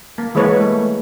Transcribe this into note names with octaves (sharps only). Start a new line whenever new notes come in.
A#3
E3 G#3 A#3 B4 C#5
A3